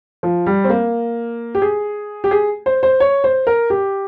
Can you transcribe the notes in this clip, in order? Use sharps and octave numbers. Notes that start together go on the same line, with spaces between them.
F3
G3
C4
A#3
G4
G#4
G4
G#4
C5
C5
C#5
C5
A#4
G4